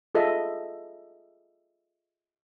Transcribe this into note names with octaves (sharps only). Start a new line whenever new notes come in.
F4 G#4 A4 D#5 E5